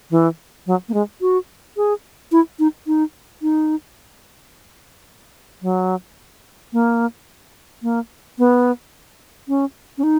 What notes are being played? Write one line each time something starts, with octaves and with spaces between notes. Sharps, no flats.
E3
F#3
A#3
G#3
F#4
G#4
E4
D#4
D#4
D#4
F#3
A#3
A#3
B3
C#4
C#4
D#4